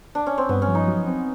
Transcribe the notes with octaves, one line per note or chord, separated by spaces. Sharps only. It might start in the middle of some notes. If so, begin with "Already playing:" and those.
D4
C#4
C4
G2 B3
C#4
F3
D#4
F#3
C4